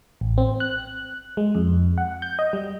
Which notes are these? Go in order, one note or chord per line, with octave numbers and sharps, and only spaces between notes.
A1
C4
F#6
G#3
F2
F#5
G6
D#5
G3